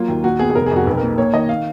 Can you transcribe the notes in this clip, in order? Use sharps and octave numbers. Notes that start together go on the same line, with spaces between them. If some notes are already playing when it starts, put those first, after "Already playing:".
Already playing: F#3 A#3 F4
D#2
A#2 F#4
B3 G#4
G#4
F1 A#4
F2 G#4
F#4
B1 B4
A#4
A#2
A#3 C#5
D#3 D#5
F5